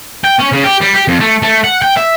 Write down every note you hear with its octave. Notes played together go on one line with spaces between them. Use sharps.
G5
C#4
C#3
G4
G3
G4
F2
A3
A3
F#5
G5
E5